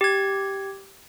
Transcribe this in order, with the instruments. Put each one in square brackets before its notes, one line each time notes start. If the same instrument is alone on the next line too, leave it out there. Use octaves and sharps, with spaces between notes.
[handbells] G4 G#6